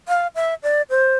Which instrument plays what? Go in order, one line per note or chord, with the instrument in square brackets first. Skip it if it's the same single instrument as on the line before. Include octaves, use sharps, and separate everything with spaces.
[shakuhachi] F5
E5
D5
C5